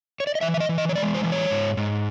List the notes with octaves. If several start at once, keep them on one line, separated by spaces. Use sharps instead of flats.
C#5
D5
D#5
E3 E5
E5
D#5
E3
D#5
C#5
G#3 D5
C5
E3
C#5
G#2
G#2